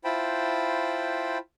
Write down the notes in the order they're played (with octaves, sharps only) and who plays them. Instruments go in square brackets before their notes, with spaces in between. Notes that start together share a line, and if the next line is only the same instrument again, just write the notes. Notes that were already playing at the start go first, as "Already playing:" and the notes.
[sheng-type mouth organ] E4 F4 C5 G5 A5 B5